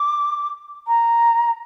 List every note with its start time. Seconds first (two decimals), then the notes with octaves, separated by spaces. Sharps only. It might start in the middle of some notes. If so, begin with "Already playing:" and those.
Already playing: D6
0.87 A#5